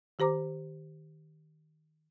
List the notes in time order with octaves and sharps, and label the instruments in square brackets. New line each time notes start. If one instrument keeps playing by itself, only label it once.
[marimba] D#3 G4 C5 A#5 D6